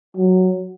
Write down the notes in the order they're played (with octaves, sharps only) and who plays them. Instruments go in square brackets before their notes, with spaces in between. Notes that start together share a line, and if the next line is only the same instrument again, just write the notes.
[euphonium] F#3